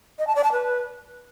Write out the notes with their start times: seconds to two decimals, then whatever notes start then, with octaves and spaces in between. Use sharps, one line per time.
0.19 D#5
0.27 A5
0.35 D5
0.44 A5
0.52 B4